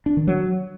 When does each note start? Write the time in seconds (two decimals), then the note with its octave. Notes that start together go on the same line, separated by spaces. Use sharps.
0.06 D4
0.17 D#3
0.27 F#3